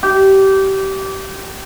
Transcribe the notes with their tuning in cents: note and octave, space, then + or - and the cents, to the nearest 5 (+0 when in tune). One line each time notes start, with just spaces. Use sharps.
G4 -25